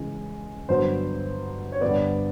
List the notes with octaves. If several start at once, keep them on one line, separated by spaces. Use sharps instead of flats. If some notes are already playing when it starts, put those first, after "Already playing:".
Already playing: C#3 E3 G#3
G2 D3 F#3 B3 C5
C#5
G2 D3 G3 B3 D5